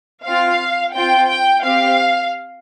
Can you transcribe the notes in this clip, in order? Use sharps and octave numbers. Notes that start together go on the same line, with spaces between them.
C4 F4 F5
C4 F4 G5
G5
C4 G4 F5